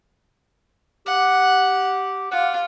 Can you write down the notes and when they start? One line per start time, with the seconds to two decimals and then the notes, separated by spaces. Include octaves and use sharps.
1.06 G4 F#5
2.31 F4 F#5